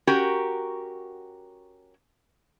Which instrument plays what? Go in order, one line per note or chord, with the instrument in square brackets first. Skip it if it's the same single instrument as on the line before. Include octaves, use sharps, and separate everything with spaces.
[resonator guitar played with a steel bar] C#4 F#4 G4 A#4